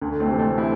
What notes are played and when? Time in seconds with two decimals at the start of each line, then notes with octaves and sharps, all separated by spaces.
0.01 D2
0.20 A3 C4
0.30 C3 E3
0.39 A3 C4
0.58 C4 E4